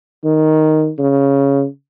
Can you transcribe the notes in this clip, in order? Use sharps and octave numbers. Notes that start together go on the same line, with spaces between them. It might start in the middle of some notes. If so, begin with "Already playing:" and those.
D#3
C#3